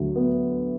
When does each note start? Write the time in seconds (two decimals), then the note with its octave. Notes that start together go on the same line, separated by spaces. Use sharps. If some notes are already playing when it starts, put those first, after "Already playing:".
Already playing: D2 F#3
0.16 B3